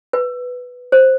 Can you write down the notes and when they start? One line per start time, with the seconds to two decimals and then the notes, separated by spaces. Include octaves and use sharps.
0.13 B4
0.92 C5